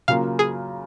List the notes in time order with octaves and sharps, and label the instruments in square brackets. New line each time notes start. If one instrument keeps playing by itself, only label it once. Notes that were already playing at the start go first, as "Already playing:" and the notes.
[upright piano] C#3 F#3 A#3 F4 [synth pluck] F5
[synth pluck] G#4